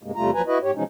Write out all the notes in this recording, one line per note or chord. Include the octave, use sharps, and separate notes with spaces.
G2 C3 G#3 A#3
E2 C3 G3 A3 F4 A#5
D#2 F3 F#3 B4 G#5 A#5
E4 F#4 B4 D#5
G#2 G4 C#5
B2 E3 F3 G#3 C#4 D#4